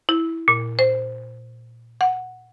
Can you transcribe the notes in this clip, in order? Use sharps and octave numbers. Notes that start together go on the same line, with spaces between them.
E4
A#2
C5
F#5